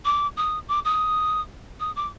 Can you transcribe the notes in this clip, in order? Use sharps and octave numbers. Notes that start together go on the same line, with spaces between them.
D6
D#6
D6
D#6
D#6
D6